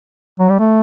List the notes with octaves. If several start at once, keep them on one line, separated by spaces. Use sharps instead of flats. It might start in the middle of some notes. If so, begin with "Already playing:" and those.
F#3
G3
A3